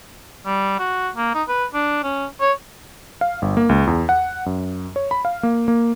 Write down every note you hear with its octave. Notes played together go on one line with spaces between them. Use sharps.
G3
F#4
A#3
D#4
B4
D4
C#4
C#5
F5
G1
A#3
C#2
E2
F#5
F#2
C#5
B5
F5
A#3
A#3